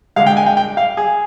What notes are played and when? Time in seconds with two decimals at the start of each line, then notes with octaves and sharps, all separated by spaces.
0.16 D3 G#3 F5
0.27 G5
0.37 G#5
0.46 G5
0.57 G5
0.77 F5
0.97 G#4